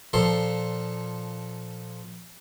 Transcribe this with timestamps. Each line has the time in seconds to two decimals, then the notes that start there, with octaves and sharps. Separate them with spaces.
0.13 A#2 F3 A4 C6